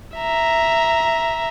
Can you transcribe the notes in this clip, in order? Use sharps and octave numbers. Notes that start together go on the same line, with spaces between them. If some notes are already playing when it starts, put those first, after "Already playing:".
E5 A#5